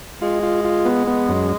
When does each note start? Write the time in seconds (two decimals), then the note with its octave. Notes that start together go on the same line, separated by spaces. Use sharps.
0.22 G#3 F4
0.43 F4
0.65 F4
0.85 B3
1.07 B3
1.29 F#2